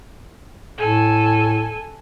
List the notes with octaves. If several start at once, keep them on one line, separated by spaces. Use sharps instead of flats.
A2 A4 G#5